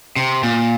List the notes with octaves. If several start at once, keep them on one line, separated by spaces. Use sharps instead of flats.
C3
A#2